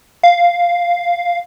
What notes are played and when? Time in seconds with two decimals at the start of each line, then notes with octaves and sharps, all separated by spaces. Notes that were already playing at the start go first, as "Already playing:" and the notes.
0.23 F5